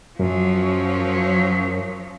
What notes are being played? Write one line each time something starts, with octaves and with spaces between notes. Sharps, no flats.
F#2 F3 F#3